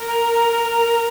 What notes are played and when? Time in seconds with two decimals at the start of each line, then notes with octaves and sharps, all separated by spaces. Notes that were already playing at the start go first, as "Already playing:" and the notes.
Already playing: A#4
0.08 A#5
0.34 A#5